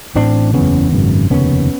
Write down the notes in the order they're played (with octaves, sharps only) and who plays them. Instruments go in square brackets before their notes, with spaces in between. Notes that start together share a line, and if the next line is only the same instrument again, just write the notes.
[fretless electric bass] A1 A2 C4 D4
F#1 E2 C#3 B3 C#4
G#1 F#2 C#3
F1 D#2 C#3 B3 C#4